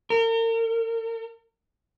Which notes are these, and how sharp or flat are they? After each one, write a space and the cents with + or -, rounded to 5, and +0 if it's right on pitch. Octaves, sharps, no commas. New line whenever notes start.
A#4 -40